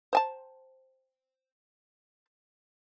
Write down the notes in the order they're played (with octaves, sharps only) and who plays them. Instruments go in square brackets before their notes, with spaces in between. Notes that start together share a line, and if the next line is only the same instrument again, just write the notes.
[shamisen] C5 G#5 A5